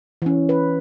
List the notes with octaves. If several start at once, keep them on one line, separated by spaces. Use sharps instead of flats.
E3 C#4
B4